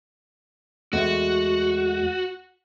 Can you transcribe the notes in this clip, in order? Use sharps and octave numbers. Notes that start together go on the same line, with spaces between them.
E2 G#3 A3 F#4